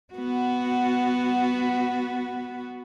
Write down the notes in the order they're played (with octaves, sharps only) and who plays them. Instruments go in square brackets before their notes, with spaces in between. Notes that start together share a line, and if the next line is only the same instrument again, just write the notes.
[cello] B3 F#4